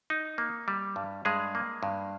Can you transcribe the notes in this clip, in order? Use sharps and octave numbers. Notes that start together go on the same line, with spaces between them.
D#4
A#3
G3
G2
G2 G#3 G#4
A#3
G2